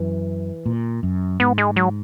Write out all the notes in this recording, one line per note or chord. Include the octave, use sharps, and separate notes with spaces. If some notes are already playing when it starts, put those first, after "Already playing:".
Already playing: F#2 E3
A#2
F#2
G#2 B3
G#3
F#3